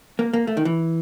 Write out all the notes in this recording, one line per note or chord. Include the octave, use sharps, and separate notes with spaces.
A#3
A#3
A3
D#3
E3